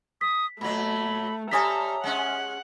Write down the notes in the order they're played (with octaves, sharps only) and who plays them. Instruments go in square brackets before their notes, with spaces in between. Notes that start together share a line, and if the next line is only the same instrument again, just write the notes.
[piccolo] D#6 [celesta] B6
[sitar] A#2 F#3 [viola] A3 [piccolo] B5
[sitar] G3 A4 C#5 [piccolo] E5 [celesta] G#5 D#6 B6 [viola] A#5
[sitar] G#3 C#4 [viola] F#5